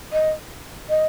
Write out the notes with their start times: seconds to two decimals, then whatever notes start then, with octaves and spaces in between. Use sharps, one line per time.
0.12 D#5
0.89 D#5